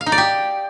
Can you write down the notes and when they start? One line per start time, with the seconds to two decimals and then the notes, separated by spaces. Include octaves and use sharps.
0.01 F5
0.06 D#4
0.12 D5
0.18 G4